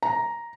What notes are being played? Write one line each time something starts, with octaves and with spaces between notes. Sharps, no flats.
A#5